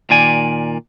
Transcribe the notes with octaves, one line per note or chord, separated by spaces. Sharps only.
A#2 D#3 D5 G#5